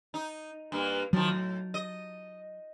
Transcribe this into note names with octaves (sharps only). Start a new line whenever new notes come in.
D#4
G2 A#3
D#3 F3 F#3
A2
D#5